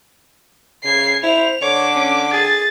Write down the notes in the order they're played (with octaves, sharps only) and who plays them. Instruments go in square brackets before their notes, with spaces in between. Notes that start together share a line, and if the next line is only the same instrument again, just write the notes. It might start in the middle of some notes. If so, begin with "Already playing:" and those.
[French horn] C#3 [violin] G#6 C7
[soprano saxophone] E4 [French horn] C5 [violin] F7
[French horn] D3 [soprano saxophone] C#5 [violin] D6
[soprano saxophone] C#4
[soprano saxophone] G#4 [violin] A6